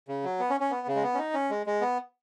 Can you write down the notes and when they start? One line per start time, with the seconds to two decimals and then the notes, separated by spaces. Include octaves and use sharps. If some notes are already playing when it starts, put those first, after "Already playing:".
0.08 C#3
0.24 F#3
0.40 B3
0.50 C#4
0.60 C#4
0.71 B3
0.87 C#3
0.95 G#3
1.03 B3
1.14 C#4
1.19 D#4
1.34 C#4
1.50 G#3
1.66 G#3
1.81 B3